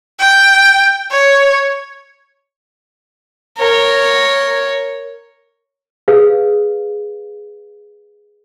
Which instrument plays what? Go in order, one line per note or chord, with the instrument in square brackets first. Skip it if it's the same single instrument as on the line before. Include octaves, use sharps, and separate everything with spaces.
[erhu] G5
C#5
[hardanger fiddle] A#4 C#5
[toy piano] G#4 B4 F5